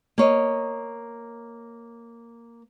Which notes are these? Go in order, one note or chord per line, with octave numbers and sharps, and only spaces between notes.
A#3 C#5 D#5